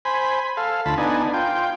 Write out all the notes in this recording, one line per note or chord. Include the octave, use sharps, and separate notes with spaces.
C5 G#5 B5
A4 F5
D2 F4 A5 B5
B3 D4 D#4 G#5
F4 G5